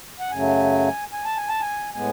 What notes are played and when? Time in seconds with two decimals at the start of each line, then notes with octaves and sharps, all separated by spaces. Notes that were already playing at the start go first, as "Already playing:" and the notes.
0.20 F#5
0.31 F#2 C#3 F#3 A3 G#5
1.13 G#5
1.25 A5
1.37 G#5
1.49 A5
1.61 G#5
1.94 A2 G#3 B3 G#5